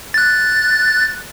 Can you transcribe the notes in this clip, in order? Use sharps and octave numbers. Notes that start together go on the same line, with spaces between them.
F#6 A6